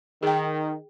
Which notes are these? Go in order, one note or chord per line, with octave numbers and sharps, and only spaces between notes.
D#3 G#4 G5